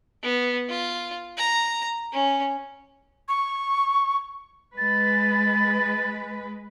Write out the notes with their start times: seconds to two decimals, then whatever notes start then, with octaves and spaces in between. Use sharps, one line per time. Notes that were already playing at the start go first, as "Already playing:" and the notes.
0.23 B3
0.69 F4
1.38 A#5
2.13 C#4
3.28 C#6
4.78 G#3 B4 A6